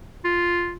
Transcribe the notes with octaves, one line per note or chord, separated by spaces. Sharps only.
F4